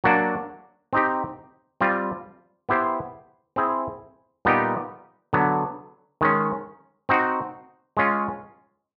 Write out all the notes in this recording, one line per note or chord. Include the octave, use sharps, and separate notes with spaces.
F#3 A#3 D4 F#4
C4 D#4 G4
G3 C4 F4
B3 E4 G4 C5
C4 E4 G#4 C5
A#2 G3 B3 D#4 G4
D3 F#3 B3
D#3 G#3 C#4
C4 D#4 F#4
G#3 C#4 F4